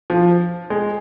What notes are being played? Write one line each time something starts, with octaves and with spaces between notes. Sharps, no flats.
F3
G#3